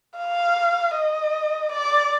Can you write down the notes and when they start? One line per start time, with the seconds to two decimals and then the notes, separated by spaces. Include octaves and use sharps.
0.18 F5
0.95 D#5
1.72 D5